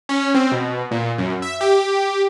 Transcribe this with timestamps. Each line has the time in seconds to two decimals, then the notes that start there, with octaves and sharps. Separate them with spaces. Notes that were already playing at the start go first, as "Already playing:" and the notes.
0.09 C#4
0.35 C4
0.52 B2
0.91 A#2
1.18 F#2
1.42 E5
1.61 G4